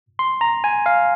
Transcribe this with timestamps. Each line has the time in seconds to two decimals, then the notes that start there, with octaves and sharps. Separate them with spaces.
0.19 C6
0.41 A#5
0.64 G#5
0.86 F5